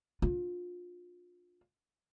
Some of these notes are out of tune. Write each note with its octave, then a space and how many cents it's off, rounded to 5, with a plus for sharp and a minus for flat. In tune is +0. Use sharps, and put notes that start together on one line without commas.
D4 +0 F4 +25